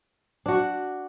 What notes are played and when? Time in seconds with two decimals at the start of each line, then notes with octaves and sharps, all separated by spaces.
0.46 D4 F#4